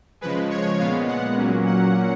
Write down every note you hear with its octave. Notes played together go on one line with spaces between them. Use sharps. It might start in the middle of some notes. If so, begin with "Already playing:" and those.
C#3 F3 G#3 B4
C#5
A#2 G#3 B3 F5
F#5
A#2 F#3 A#3 C#4
F#5